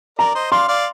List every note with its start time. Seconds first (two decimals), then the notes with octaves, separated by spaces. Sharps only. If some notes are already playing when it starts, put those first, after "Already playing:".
0.19 A#4 D5 A#5
0.35 C5 D#5
0.52 D5 F5 C6
0.68 D5 F5